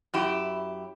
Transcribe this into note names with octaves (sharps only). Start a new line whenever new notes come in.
F#2 E4 G4